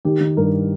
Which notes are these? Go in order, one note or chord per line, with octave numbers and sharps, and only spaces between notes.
D#3 G4
D#3
G2 A#4